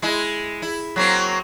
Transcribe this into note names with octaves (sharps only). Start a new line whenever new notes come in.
G#3 E4
E4
F#3 A#3 C4